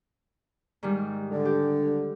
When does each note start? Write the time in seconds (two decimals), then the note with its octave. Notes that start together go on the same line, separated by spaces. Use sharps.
0.83 G#2 D#3 G3
1.31 D3
1.45 G4